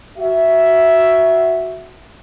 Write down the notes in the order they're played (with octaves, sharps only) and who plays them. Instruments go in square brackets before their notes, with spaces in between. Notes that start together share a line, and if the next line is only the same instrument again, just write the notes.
[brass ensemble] F#4 E5